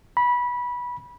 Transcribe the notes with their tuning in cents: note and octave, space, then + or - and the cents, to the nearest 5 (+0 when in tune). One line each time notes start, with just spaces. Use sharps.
B5 -20